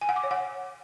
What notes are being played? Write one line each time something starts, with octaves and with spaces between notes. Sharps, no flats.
G#5
F#5
D6
C#5
F#5